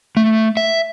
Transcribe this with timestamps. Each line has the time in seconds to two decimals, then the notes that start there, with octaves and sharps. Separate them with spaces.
0.17 A3
0.57 E5